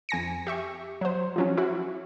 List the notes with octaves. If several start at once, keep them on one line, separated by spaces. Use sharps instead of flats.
F2 G#5 A#6 C#7
G4 E5 C#6
F#3 C5
F3 F#3 C#4
E4 F#4